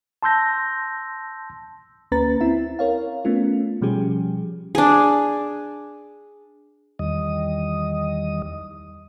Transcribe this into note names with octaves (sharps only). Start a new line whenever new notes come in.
A5 C6 E6 G6 A#6
D2 A#3 C#4 B4 A#5 A6
C4 E4 E5
A#4 C#5 F5
A3 B3 C#4 F4
B2 F3 G3 C#4 G4 G#4
D4 G#4
E2 D#3 G3 D#5 D#6